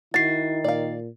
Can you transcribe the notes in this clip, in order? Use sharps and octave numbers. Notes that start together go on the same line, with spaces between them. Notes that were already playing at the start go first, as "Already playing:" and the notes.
D#3 E4 F#4 A6 C7
A#2 D5 F5